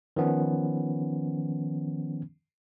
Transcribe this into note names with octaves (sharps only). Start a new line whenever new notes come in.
D#3 F3 B3 C#4